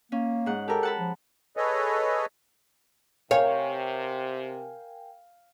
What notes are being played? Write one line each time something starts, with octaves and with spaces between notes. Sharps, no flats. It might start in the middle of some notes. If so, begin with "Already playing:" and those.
A#3 C#4
G#2 F#5
G4 A4 A#4
F#5 A5 B5
F3
G#4 A4 B4 C#5 D#5
C3 A#4 C#5 F5 G5 G#5